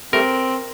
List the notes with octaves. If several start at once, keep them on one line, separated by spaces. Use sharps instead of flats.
G3 A3 C4 A#4